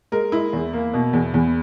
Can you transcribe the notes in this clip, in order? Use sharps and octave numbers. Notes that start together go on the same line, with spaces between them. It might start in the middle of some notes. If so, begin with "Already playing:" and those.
G#3 A#4
G#3 E4
E2
A#3
B2
E2
E2